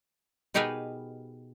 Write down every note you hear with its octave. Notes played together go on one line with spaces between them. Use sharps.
B2 D#4 G4 G#4 A#4 B4